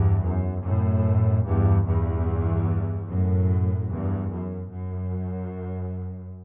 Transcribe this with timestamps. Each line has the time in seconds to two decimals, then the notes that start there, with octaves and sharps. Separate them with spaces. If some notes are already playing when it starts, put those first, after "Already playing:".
Already playing: E2 G2
0.24 F#2
0.64 F#2 A2
1.45 E2 G2
1.87 E2 G2
3.09 F#2 A2
3.90 E2 G2
4.31 F#2
4.72 F#2